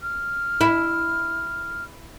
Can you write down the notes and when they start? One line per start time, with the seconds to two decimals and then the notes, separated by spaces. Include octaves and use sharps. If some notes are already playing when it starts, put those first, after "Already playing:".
0.02 F6
0.61 E4